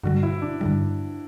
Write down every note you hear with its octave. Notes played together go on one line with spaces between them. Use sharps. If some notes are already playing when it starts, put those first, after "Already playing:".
G2 D3 G3 F#4
E4
D4
G2 D3 G3